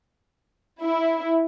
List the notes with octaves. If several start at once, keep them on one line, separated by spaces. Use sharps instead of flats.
E4